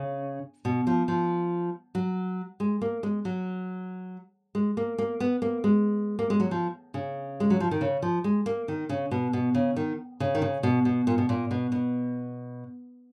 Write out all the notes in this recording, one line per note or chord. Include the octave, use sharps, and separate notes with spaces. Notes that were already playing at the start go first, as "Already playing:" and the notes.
Already playing: C#3
B2
F3
F3
F#3
G#3
A#3
G#3
F#3
G#3
A#3
A#3
B3
A#3
G#3
A#3
G#3
F#3
F3
C#3
G#3
F#3
F3
D#3
C#3
F3
G#3
A#3
D#3
C#3
B2
B2
C#3
D#3
C#3
D#3
C#3
B2
B2
A#2
B2
A#2
B2
B2